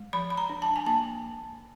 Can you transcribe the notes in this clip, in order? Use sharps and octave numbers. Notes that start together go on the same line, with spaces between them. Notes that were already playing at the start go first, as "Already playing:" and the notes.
Already playing: G#3
F3 B5
B5
A#5
D4
A5
G#5
A#3 A5